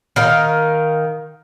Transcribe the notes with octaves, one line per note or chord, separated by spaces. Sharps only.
D#3 A#4 F5